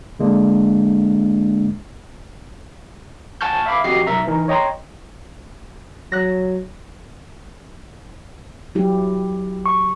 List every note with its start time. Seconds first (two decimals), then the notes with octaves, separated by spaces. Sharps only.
0.19 D3 G#3 A#3 D4
3.41 F#5 G#5 A5 C#6 F6 G6
3.66 E5 F5 B5 D6
3.84 F2 F#4 G4 D#5 F#5 C7
4.07 B1 A#4 E5 A#5
4.27 E3 D#4 A#4
4.48 C#5 D#5 G5 A#5 C6
6.12 F#3 F#6 A#6
8.75 F#3 E4 G4
9.66 C#6